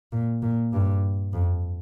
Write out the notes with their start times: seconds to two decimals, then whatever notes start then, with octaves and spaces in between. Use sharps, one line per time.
0.12 A#2
0.43 A#2
0.73 G2
1.33 F2